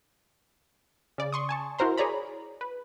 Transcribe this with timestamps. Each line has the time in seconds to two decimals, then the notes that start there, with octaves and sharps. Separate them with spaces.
1.18 C#3 D5
1.33 C6 C#6 D#6
1.49 G#5 A5 C#6
1.79 E4 F#4 A#4 C5 A#5 C6
1.98 G#4 C#5 D5 A#5 B5
2.61 B4